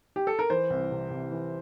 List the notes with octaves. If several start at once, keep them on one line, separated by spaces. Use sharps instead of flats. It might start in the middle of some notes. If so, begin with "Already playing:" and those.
G4
A4
A#4
E3 C5
C2
C3
C2
E3